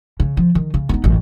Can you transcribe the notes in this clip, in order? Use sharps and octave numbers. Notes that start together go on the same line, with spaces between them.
C#3
F3
D#3
C#3
B3 D#4
A1 F#2